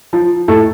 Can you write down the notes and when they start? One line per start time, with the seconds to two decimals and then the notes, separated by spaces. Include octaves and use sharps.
0.13 F3
0.48 A2 A4